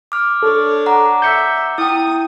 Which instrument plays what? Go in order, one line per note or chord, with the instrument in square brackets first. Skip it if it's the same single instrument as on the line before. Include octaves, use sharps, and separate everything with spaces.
[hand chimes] D6 F6
[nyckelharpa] D4 C#5 [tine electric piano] A4
[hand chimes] F#5 A#5 D6
[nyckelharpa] E5 [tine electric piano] G6 C#7
[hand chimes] E4 G5 [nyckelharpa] D#6